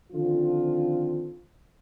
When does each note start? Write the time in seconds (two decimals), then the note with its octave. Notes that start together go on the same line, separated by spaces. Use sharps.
0.12 D3 D#3 F3 C4 F4